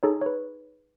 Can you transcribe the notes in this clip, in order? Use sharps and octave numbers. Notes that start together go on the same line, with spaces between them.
D#4 G#4 A4 C#5
C#5
B4